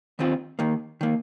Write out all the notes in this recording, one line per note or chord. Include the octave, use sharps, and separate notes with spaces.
D#2 D#3 C4 F4
D#2 D#3 A#3
D#3 A#3